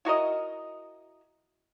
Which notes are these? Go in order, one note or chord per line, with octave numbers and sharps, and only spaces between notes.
E4 F#4 A#4 D#5